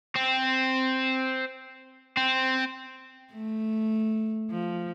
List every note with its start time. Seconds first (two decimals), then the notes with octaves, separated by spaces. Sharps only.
0.16 C4
2.17 C4
3.33 A3
4.50 F3